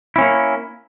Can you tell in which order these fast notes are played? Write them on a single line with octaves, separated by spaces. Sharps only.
E4 C#4 A#3